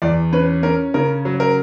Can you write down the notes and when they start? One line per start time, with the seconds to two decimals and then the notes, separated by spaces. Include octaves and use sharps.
0.02 E2 D5
0.33 C#4 B4
0.63 C#4 A#4
0.94 C#3 A#4
1.25 F#3
1.40 A#4